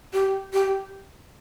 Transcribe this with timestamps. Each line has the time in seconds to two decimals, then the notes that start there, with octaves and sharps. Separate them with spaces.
0.13 G4
0.53 G4